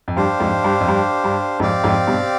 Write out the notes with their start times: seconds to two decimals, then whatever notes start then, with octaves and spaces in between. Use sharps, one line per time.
0.08 F2
0.16 G2 D4 G4 C5 F5
0.40 F2 G#2
0.64 G2
0.80 F2
0.88 G2
1.24 G2
1.60 F2 G#2 C4 G4 D5 F5
1.84 F2 G#2
2.07 G2 B2